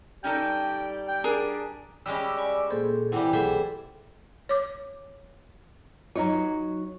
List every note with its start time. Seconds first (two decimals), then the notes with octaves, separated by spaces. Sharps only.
0.24 G3 C#4 D#4 G4 A4 D5 G5
1.08 G5
1.24 D4 G#4 A#4
2.06 G3 G#3 C#4 B5 D6 E6
2.37 D5 G#5
2.71 A#2 G#4 A4 C5
3.12 C3 E3 G3 E4 F#5
3.33 B1 A3 G#4 A4 C5 E5
4.49 C#5 D6
6.16 F#3 D#4 F4 C#5 D#5 A#5